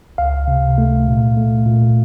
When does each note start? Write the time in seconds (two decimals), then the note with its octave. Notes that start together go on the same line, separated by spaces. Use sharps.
0.18 C#2 F5
0.48 C3
0.78 A3
1.07 A#2
1.37 A3
1.66 A#2